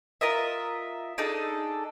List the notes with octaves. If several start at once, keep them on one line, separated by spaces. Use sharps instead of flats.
F4 A#4 D#5 E5
D4 D#4 G#4 A4